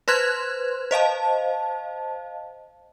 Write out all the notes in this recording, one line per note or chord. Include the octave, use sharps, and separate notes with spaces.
B4 C5 C6 F#6 G#6
C5 D#5 F5 A5